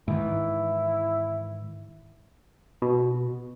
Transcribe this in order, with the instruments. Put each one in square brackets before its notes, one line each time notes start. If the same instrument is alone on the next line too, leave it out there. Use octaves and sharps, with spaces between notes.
[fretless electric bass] G#2 D#3 E3 [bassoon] E4
[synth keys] B2